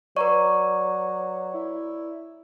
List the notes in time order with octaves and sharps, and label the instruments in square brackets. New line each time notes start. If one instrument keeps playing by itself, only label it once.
[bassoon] F#3 [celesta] B4 A#5 C#6 [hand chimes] D5
[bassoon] E4